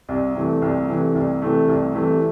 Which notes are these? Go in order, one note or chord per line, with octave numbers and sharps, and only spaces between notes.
C2
C3 E3 A3
C2
C3 E3 A3
C2
C3 E3 A3
C2
C3 E3 A3